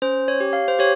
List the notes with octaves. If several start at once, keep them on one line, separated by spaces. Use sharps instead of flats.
C#4 C5
C#5
G4
F5
C5
G4 C#5